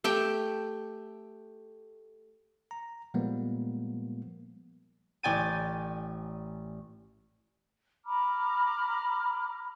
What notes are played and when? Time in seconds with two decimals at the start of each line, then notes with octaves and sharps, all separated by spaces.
0.04 A3 G4 G5
2.71 A#5
3.14 A#2 F3 G3 G#3 A#3 B3
5.23 A1 D5 G5 G#5 A6 D#7
8.05 A#5 B5 D6 F6